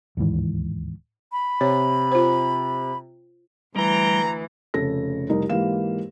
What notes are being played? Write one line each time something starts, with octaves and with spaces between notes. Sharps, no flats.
D1 D#2 G#2 E3
B5
C3 C#5
F4 C5
D2 E3 G3 A#5
F1 C#3 A4 A#6
F1 C2 D#4 G4 A#4
G#2 E3 A#3 G4 F5 E7